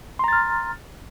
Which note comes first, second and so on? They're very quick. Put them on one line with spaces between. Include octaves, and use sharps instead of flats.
C6 A#5 A6 F6